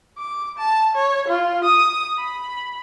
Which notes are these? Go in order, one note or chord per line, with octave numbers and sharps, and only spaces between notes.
D6
A5
C#5
F4
D#6
B5